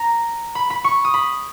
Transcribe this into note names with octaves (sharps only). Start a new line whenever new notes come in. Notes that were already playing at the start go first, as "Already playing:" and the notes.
Already playing: A#5
B5
B5
C#6
D#6
B5